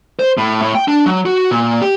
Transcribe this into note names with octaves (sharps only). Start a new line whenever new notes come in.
C5
A2
A2
G5
D4
F#3
F#4
A#2
G4